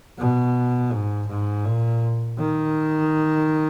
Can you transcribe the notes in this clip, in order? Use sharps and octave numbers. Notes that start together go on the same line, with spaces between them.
B2
G#2
G#2
A#2
D#3